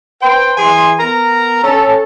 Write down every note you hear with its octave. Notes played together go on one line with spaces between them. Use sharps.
B4 C5 G5
E3 G#4 G#5 C6
B3 A#4 A#5
C#4 A4